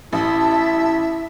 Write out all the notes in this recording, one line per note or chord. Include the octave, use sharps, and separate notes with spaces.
A1 E4 E5 A5